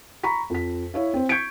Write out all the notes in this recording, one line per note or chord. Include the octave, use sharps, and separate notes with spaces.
A#5 B5 C#6 B6
F2 B6
E4 C#5 F5
C4 C5
C#6 G6 G#6 B6 C#7 D7